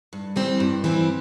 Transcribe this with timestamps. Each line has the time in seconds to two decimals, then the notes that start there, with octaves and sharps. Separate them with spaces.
0.13 G2
0.36 E3 G3 C4
0.60 G2
0.84 E3 G3 C4